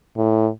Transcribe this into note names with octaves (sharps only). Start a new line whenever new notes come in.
A2